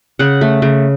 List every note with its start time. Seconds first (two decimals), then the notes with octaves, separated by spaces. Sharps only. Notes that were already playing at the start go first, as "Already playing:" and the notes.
0.19 C#3 F#5
0.41 A3
0.62 C#3